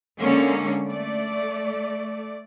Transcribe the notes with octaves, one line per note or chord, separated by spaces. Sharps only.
D3 G#3 A#3 C#4
A3 D5